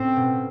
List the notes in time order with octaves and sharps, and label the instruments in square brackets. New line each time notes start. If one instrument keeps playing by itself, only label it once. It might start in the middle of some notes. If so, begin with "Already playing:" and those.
Already playing: [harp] A2 C#4 [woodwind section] C4
[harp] B2